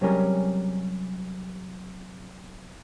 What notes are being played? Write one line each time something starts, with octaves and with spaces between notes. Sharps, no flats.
C3 F#3 G3 C#4 G#4 A#4